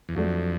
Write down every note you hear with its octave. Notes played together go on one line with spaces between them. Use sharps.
E2
F2 F#3 A3 D4 F#4